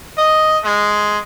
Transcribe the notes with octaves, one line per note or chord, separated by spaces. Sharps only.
D#5
G#3